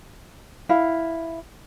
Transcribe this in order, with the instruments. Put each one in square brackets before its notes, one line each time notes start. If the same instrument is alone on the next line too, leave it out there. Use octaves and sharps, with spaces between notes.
[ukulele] E4 F5